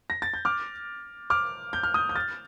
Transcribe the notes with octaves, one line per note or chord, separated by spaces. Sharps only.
A#6
A6
G6
D6 F6
D6 F6
G6
F6
D#6 G6
G6
F6 A6